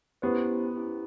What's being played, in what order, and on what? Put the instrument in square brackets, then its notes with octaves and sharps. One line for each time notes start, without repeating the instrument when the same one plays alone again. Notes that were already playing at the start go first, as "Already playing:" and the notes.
[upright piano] B3 [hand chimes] C#4 E4 G4 C5
[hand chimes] C#4 E4 G4 C5